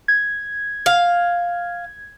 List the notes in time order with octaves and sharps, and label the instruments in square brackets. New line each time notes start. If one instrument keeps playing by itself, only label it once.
[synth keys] G#6
[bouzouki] F5